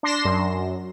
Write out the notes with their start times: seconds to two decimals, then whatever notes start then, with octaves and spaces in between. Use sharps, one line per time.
0.03 D4 C6 A#6 C7 E7
0.25 F#2